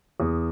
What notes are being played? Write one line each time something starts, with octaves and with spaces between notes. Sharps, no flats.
E2